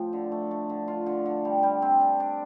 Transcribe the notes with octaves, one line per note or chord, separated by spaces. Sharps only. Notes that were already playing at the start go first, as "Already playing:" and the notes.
Already playing: A2 F3 C4
D3
A3
A3
D3
F4
D3
D3
G3
G3
C4
D4
D4